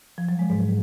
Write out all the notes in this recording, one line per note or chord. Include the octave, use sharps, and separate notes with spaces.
F3
F#3
G#3
G#2